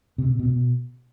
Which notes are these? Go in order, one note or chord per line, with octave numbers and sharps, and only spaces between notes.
C3
B2
B2
B2